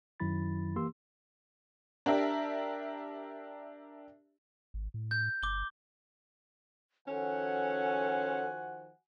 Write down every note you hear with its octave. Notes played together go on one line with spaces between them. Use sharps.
F#2 D#3 F#3 E4 B5 A6
E3 A#3 G4 C6 E6
D4 G4 A#4 E5 A5
G#1
A2
G6
G1 D6 G7
D#3 F3 C#4 F#4 A4 C5 F#5 G#5